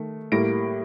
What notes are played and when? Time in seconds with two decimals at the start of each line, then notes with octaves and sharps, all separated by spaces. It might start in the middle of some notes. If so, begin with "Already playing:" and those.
Already playing: D#3 A3
0.32 A2 G3 A#3 A#6 D7